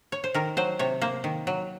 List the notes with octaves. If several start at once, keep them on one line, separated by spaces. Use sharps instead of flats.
C#5
C5
D#3 A#4
F#3 C5
C3 C#5
A#3 C5
D#3
F#3